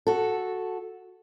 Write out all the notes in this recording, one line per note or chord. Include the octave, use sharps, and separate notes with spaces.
F#4 A4